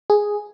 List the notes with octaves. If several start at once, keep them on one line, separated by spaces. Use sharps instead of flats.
G#4